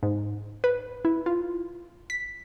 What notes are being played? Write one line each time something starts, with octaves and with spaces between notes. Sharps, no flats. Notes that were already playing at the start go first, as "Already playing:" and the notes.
G#2
B4
E4
F4
B6